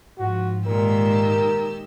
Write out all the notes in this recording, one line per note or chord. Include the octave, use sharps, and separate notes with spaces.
G#2 F3 F#4
A#2 D#3 G#3 G4 A#4 E6